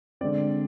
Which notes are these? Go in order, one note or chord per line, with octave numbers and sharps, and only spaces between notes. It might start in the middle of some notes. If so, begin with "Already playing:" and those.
D3 G#3 C4 D5